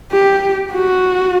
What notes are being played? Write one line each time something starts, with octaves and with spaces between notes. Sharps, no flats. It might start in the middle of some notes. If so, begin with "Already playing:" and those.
G4
F#4